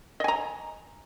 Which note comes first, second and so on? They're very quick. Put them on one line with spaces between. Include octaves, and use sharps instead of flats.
D#5 G#5 A#5